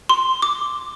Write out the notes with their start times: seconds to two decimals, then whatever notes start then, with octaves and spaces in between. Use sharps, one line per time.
0.09 C6
0.42 D6